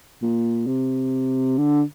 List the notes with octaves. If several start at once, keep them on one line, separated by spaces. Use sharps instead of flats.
A#2
C3
D3